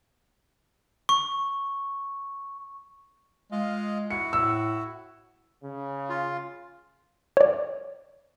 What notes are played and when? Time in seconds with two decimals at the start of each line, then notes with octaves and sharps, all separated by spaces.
1.09 C#6
3.52 G#3 F4 D#5 F5
4.11 E4 F#4 C#7
4.33 A2 E6
5.64 C#3
6.09 F4
7.37 C#5 D5